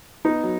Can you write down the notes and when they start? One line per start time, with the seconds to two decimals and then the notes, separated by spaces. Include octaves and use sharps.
0.25 B3 D#4
0.44 F#3